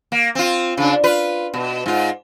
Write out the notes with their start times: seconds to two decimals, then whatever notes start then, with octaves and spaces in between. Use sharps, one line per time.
0.12 A#3
0.35 C4 F4
0.77 C#3 D4
1.04 F4 B4
1.54 B2
1.86 G#2 F4